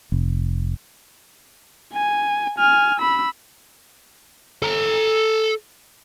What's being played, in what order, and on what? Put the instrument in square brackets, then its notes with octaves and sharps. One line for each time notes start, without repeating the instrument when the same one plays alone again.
[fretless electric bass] F1
[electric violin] G#5
G#5 F6
B5 E6
[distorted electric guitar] A4 A#5